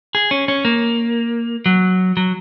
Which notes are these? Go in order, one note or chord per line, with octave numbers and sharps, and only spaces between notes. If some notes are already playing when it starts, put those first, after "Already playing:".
G#4
C#4
C#4
A#3
F#3
F#3